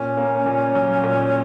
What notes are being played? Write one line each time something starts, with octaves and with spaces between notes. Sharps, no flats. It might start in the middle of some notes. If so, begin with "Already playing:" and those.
Already playing: A#2 C#4
A#3
A#2
F#3
A#2